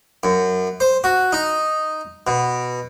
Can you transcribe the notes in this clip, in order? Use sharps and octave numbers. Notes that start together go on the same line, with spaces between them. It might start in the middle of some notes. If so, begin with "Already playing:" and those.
F#2
C5
F#4
D#4
B2